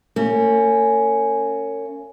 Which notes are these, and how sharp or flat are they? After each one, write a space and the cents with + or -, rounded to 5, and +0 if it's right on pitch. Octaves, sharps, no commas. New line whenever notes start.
A#3 -40 C#4 +5